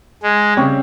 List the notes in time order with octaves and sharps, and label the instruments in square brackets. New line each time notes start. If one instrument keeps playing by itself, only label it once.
[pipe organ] G#3
[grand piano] C#3 G3 C4 G4 C#5